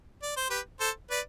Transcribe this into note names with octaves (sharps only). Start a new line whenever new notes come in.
D5
C5
G4 B4
A4 C5
B4 D5